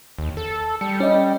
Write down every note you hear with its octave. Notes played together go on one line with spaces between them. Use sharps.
D#2
A4
G3 C#7
C#4 D#5